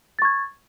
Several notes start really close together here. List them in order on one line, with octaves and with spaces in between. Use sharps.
A6 C#6 G#6